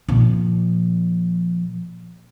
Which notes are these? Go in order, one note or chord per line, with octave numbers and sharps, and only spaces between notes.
A#2 F3